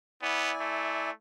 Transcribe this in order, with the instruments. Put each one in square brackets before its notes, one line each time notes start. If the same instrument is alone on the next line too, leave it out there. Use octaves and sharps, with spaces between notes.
[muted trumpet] B3 [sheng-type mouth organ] E4 D5 G#5
[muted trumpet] A3